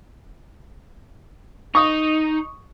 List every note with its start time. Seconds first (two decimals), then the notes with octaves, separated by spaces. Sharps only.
1.75 D#4 C#6 D#6